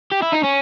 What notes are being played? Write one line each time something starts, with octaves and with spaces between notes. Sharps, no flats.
G4
E4
D#4
C#4